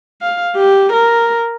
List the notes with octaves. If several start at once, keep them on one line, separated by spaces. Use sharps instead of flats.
F5
G4
A#4